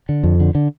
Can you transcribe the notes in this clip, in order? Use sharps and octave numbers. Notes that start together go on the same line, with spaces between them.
D3
F2
D3
D3